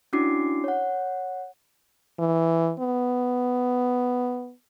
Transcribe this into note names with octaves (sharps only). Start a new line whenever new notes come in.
C#4 D4 E4 F#4 D6 C7
C#5 F#5
E3
B3